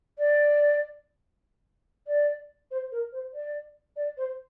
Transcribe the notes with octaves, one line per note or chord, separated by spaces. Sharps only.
D5
D5
C5
A#4
C5
D5
D5
C5